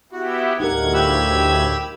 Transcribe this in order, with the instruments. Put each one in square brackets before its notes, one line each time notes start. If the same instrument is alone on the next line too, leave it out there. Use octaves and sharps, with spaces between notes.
[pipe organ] B3 E4 G4 [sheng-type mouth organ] F#4
[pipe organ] D2 A2 G#6 [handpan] D#4 G4 A#4 [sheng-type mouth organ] F#5
[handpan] F4 [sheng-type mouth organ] G4 B5 E6